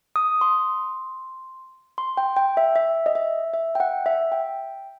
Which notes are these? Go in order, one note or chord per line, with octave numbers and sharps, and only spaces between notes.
D#6
C6
C6
G5
G5
E5
E5
D#5
E5
E5
G5
F#5
E5
G5